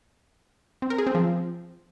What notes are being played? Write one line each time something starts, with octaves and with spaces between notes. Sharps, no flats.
C4
A#4
G#4
C4
F3